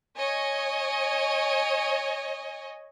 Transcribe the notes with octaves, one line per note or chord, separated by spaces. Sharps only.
C#5 D#5 G#5